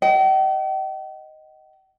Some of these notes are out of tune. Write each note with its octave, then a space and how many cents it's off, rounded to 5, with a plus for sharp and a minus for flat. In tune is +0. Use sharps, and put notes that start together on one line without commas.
D#5 +0 G5 -45